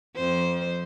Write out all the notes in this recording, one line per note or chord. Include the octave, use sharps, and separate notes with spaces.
F2 C5